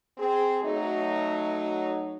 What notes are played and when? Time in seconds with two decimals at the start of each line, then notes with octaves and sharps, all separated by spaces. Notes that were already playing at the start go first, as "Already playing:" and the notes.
0.18 C4 G#4
0.63 F#3 A3 D#4